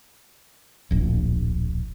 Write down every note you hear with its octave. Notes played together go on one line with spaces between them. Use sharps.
D1 A#1